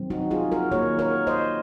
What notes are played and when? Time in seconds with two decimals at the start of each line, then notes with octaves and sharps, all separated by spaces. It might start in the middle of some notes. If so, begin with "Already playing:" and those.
Already playing: D#3 F#3 C4
0.10 D#4 F#4
0.31 F4 G#4
0.52 F#4 A#4
0.71 D#3 A#3 A#4 C#5
0.99 A#4 C#5
1.27 C5 D#5